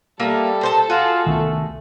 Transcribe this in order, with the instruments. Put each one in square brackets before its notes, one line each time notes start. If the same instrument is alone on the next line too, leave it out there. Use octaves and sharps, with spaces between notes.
[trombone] G3 [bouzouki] A#3 F4 E5 [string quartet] A4
[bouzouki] A#2 C5 A5
[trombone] F4 [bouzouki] F#4 G#4 F#5
[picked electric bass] C2 D#3 [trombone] A3